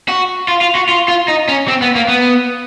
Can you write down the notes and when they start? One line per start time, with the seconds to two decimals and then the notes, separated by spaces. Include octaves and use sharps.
0.08 F#4
0.48 F4
0.61 F4
0.75 F#4
0.89 F4
1.08 F4
1.28 D#4
1.49 C#4
1.68 C4
1.82 B3
1.95 A#3
2.08 B3